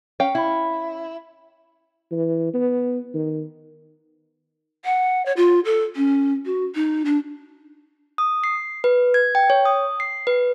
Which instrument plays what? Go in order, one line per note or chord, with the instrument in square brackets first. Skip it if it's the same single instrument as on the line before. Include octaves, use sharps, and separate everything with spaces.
[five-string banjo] C#4 F5 G5
[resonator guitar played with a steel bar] E4
[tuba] E3
B3
D#3
[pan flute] F#5
C#5
F4
A4
C#4
F#4
D#4
D4
[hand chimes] D#6
C7
B4
G#6
G5
C#5
D#6
C7
B4